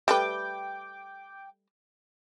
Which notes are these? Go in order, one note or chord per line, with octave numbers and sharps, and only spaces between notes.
G3 A3 B4 G5 D6